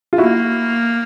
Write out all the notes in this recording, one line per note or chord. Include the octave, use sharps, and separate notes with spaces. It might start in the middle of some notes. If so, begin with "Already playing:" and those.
F4
A#3 E4 F#4